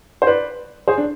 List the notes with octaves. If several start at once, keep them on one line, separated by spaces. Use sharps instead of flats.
C5
B4 D5
G#4 C5
D4